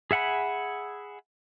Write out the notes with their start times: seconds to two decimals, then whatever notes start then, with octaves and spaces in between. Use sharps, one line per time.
0.11 G#4 E5 F#5 G#5 B5